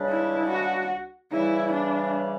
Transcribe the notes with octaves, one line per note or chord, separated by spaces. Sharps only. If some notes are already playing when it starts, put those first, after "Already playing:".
Already playing: C#2 C#3 G3 D4
E4
F#4
C#3 E3 G3 E4
D4